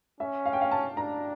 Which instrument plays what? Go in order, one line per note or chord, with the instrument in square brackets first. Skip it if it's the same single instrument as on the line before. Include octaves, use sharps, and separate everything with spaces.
[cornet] C#4 [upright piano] E5
[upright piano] F5
G5
F5
A5
[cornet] D4 [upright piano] A#5